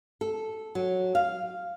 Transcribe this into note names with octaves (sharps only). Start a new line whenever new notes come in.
A4
F#3
F5